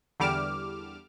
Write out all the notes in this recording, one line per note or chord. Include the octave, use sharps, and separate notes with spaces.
E2 D3 G3 D6 F6 E7